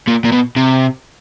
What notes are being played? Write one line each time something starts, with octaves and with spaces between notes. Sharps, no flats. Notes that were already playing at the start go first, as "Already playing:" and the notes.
A#2
A#2
B2
C3